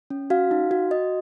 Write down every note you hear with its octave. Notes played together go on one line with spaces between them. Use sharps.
C#4
F#4 F5
D#4
F#4
F#4 D#5